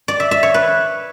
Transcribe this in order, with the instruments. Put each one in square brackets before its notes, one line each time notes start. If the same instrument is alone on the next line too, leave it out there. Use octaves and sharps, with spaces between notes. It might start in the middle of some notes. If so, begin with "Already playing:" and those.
[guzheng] D5
E5
E5
C#5
B4